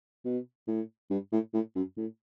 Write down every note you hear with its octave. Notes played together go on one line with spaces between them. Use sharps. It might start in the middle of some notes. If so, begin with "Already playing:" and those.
B2
A2
G2
A2
A2
F#2
A2